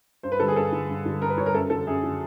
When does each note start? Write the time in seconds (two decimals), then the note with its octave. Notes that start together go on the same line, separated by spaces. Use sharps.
0.23 G2 C5
0.32 B4
0.40 D3 G3 A4
0.48 G#4
0.56 G2 A4
0.73 D3 G3
0.89 G2
1.06 D3 G3
1.22 G2 A#4
1.30 B4
1.37 D3 G3 C#5
1.46 A#4
1.54 F#2 A4
1.70 D3 F#3 A4
1.87 F#2 G#4
2.03 D3 F#3